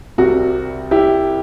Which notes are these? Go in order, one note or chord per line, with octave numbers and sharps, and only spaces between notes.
C2 C3 G3 F#4
E4 G4